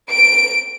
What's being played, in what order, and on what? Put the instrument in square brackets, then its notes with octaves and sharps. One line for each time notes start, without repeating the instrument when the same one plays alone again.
[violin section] D7